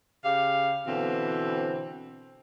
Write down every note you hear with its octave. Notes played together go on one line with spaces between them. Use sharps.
C#3 G4 F5
B2 D3 E3 C4